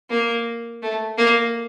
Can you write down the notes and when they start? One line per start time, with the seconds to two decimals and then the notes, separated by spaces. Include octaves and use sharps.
0.10 A#3
0.82 A3
1.18 A#3